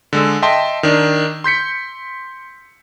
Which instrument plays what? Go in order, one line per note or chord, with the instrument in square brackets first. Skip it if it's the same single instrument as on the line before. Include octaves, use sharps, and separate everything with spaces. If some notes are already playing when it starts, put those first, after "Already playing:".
[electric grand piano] D3 G#3 E6
D#5 E5 G5 A5 C6
D#3 D4
C6 G6 B6 C#7